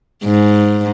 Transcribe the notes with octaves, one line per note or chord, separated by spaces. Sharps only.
G#2